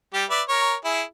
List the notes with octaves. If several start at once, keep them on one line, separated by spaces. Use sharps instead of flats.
G3 G4
B4 D5 E5
A#4 C#5
E4 G#4